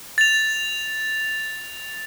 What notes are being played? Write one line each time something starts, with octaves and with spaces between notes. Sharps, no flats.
A6 F7